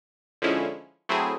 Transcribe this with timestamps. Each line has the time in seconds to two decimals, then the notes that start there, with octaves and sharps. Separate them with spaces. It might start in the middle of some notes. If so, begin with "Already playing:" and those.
0.42 D3 F3 G#3 C#4 E4
1.09 F#3 A3 C4 E4 G#4